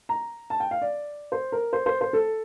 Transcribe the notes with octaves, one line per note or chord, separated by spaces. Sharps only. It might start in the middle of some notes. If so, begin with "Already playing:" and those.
A#5
A5
G5
F5
D5
C5
A#4
C5
C5
C5
A4